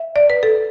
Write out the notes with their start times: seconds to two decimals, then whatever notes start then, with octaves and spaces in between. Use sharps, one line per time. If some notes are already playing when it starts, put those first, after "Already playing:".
Already playing: E5
0.16 D5
0.30 B4
0.43 A4